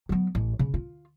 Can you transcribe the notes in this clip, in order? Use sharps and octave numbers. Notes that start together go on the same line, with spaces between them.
F#3 B3
A1
C#3
F4